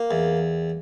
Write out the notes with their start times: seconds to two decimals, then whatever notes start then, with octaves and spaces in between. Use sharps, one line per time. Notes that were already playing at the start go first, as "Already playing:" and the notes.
Already playing: A#3
0.11 E2